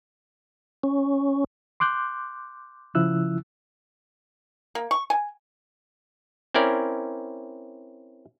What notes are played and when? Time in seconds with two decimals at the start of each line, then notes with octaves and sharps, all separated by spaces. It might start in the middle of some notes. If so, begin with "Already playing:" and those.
0.83 C#4
1.80 C6 D6 F#6 G6
2.95 C#3 F3 E4 E6 F#6
4.75 A#3
4.91 C#6
5.10 G#5
6.54 C4 C#4 E4 A#4 D5